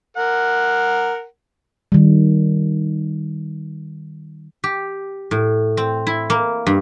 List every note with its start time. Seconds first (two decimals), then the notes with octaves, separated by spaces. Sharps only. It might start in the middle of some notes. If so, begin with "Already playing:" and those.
0.17 A#4 F#5
1.92 D#3 G3
4.64 G4
5.31 A2
5.77 C4
6.07 E4
6.30 A#3
6.67 G2